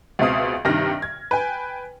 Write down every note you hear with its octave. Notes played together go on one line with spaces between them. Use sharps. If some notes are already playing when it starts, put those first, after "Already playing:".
C#2 B2 C4 E5 F5 D#6
G2 C3 D#3 F6 A#6
G#6
B4 G5 G#5